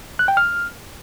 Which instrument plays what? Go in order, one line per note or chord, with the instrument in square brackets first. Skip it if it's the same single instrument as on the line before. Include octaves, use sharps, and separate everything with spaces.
[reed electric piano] F#6
G5
F6